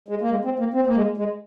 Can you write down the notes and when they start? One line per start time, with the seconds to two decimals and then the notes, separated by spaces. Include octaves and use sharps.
0.08 G#3
0.21 A#3
0.31 G#3
0.45 C4
0.59 A#3
0.74 C4
0.87 A#3
0.96 G#3
1.17 G#3